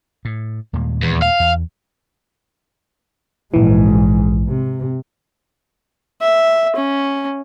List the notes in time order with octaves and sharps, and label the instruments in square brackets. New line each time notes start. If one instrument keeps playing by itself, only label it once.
[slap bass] A2
D#2 A#2 G#3
[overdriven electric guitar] E2
F5
[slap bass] E2
[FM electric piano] A#1 E3 [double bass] G#2 G#3
[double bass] C3
[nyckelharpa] E5
C#4